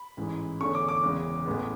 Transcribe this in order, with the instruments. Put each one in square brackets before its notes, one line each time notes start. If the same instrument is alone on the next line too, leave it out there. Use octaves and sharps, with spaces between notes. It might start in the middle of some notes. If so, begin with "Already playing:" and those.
Already playing: [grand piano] B5
A1 G#2 E3 G#3
F#1 E2 D3 A3 C#4 C#6
D6
D6
F#1 E2 C#3 G#3
A1 A2 G#3 B3